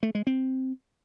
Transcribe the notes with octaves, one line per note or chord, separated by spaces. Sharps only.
A3
G#3
C4